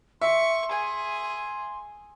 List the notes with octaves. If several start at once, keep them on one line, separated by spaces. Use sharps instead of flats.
E5 C6 C#6
G#4 G#5